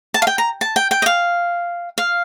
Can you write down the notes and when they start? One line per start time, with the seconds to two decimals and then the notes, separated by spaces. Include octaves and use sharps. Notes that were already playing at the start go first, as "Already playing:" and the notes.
0.14 A5
0.22 F5
0.27 G5
0.38 A#5
0.61 A5
0.76 G5
0.91 G5
1.02 D#5
1.06 F5
1.98 F5